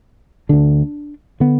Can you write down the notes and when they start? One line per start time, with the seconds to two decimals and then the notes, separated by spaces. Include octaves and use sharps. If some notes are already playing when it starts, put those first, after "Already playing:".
0.49 D2 D3 D4
1.40 D3 B3